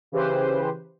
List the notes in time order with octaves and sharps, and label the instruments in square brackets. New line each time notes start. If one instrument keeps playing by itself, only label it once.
[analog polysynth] C#3 E3 G4 B4 C5